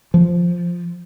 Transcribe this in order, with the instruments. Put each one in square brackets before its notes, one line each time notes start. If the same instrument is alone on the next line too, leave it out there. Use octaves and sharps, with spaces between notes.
[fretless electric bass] F3